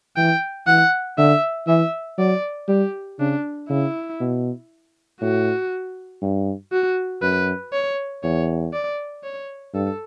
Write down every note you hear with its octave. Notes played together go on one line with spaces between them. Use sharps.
E3 G5
E3 F#5
D3 E5
E3 E5
F#3 D5
G3 G4
C#3 D4
C#3 E4
B2
A2 F#4
G2
F#4
F#2 B4
C#5
E2 C#5
D5
C#5
G2 A4